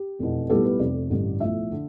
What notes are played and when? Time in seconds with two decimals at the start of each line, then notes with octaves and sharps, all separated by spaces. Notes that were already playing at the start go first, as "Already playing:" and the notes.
Already playing: G4
0.19 F1 E2 B2
0.49 B1 A2 G3 B3 A4
0.65 B4
0.79 F1 F2 C3 D5
1.10 A1 G2 D3 G3
1.40 B1 A2 F3 A3 E5
1.72 D3